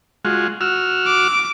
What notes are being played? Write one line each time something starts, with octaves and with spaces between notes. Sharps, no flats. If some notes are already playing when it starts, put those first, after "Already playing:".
G#3 F4 F#4
F#4 E6 F6
D6